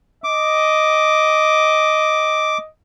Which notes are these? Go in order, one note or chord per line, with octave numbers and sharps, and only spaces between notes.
D#5 D6